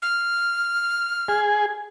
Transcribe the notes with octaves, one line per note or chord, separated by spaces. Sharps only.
F6
G#4